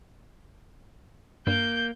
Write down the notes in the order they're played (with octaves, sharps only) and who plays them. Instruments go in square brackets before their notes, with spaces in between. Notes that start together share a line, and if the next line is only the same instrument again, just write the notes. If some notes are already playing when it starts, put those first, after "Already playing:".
[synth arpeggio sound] G2 [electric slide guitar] A#3 [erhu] G6